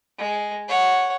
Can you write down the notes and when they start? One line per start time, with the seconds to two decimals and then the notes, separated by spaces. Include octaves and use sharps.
0.18 G#3
0.68 C#5 F#5